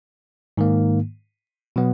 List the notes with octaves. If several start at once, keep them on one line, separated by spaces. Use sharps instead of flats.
G#2 D#3 A#3
B2 F#3 B3